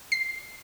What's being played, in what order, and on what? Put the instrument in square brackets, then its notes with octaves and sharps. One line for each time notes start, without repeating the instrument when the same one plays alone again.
[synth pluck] C7